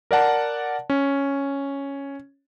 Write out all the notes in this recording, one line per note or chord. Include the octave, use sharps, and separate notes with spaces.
A#4 D5 F#5 A5
C#4